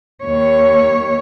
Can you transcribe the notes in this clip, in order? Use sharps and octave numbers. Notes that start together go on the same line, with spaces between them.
D#2 C#5